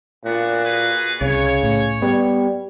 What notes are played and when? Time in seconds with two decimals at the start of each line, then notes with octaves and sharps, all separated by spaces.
0.25 A#2 B3 D4 F#4
0.64 F#4 G#4 B4
1.21 C2 C#3 C#5
1.63 A2
2.02 G3 B3